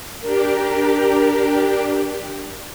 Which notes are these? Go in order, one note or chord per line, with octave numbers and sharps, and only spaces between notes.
D4 G4 A#4